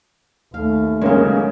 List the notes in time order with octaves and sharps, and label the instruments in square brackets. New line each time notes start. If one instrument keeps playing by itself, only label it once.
[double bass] D#2 A3 [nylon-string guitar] F5
[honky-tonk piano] C#3 A#3 C#4 [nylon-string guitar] F#3 G#3